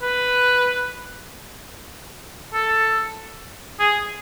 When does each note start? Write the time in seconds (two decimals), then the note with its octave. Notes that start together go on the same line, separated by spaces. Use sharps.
0.02 B4
2.53 A4
3.80 G#4